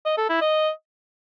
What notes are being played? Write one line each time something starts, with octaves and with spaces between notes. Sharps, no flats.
D#5
A4
E4
D#5